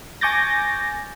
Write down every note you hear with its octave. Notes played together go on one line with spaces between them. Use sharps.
G#5 C#6 D6 G6 A6 A#6